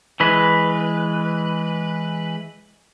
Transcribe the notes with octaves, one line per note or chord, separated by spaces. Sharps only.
E3 G#3 B4